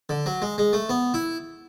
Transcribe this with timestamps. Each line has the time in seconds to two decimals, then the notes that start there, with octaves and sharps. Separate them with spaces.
0.09 D3
0.26 F#3
0.42 G#3
0.58 G#3
0.73 A3
0.89 B3
1.14 E4